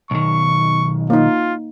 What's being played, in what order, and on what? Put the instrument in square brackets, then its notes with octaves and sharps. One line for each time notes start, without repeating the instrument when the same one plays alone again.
[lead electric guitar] B1 D#3 [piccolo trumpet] C#6
[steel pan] A#3 D#4 [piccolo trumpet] F4